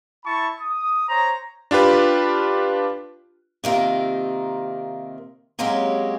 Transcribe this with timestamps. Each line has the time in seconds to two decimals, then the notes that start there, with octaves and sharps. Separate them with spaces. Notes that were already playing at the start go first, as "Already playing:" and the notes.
0.24 E4 A5 B5 C#6
0.59 D#6
1.09 C5 C#5 A#5
1.71 D4 F4 G4 B4
3.64 C3 D#3 A#3 C4 F4
5.59 F#3 G#3 A#3 C4 C#4 G4